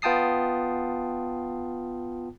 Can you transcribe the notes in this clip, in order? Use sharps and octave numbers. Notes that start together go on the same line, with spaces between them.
B3 F4 G5 A5 D#6 C7